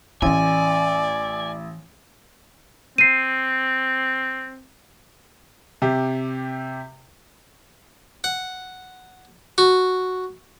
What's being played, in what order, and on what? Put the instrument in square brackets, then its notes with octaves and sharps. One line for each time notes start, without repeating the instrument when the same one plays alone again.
[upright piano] A1 [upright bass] E3 A3 [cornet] D5 [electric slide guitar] G#5
[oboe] C4 [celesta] C7 D#7
[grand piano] C3 G4
[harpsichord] F#5
F#4